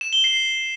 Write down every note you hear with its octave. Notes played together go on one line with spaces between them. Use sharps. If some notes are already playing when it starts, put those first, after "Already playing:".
E7
G7
C7